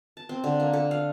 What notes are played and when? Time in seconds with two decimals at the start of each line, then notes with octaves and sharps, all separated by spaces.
0.17 A5
0.29 C4
0.44 D3
0.60 A#3
0.73 A4
0.91 F5